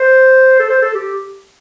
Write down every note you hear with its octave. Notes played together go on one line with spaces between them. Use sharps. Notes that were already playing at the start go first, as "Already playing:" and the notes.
Already playing: C5
A4
C5
A4
G4